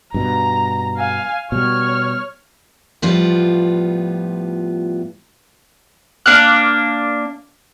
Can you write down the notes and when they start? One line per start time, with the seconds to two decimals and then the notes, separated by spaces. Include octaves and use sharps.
0.14 G2 B2 A#5
0.97 F5 G#5
1.52 B2 G3 C#5 F6
3.02 A2 F3 G3 B3 F4
6.26 A#3 D4 F5 F#6